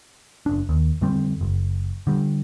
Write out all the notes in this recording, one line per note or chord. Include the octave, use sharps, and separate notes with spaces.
F#1 D4
D#2
F2 D3 G3 C4
F#1
D3 G3